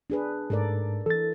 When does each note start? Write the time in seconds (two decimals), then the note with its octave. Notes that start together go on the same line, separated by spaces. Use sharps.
0.10 D4 G#4 B4
0.50 G#2 A4 A#4 D5
1.06 E3 A4 A6